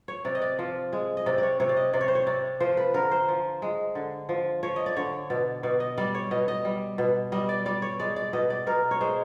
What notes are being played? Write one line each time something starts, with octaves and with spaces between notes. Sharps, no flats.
C#5
C3 D5
D#5
D5
F3
G#3
D#5
C3 D5
C#5 D5
C3 C#5
D5
D#5
C3 D5
C#5
C5
C#5
C3 D5
F3 C5
B4
D3 A#4
C5
F3
G#3
D3
F3
F3 C#5
D#5
D5
D3 C#5
B2 D5
B2 D5
D#5
G3 D5
C#5
B2 D#5
D#5
G3
B2
G3 D#5
D5
G3 D5
C#5
G#3 D5
D5
B2 D#5
D5
B2 A#4
C#5
G#3 C5